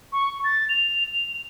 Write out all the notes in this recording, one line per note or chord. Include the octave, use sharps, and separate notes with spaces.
C#6
A6
F7
F7